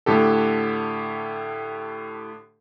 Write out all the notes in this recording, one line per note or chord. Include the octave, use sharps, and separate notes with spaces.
A2 D3 G4 A4